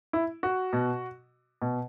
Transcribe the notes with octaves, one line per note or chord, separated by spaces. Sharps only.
E4
F#4
B2
B2